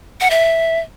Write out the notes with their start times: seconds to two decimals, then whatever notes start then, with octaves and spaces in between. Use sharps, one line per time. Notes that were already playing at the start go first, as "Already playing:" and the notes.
0.21 F#5
0.30 E5